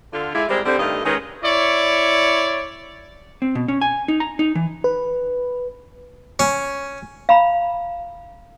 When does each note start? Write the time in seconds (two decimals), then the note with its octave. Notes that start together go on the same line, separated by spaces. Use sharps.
0.13 D3 F4
0.34 G#3 E4 F4 D5 E5 F5
0.49 G3 G#3 C4 A#4 C5 D5
0.65 D3 G3 C4
0.79 G2 D#3 A3 D#5 F5
1.04 D#3 G#3 C#4 D#4 B4
1.42 E4 C#5 D5 C#6
3.42 C4
3.55 B2
3.68 C#4
3.81 G#5
4.08 D#4
4.20 A#5
4.39 D#4
4.55 E3
4.84 B4
6.39 C#4
7.29 F5 A#5 B5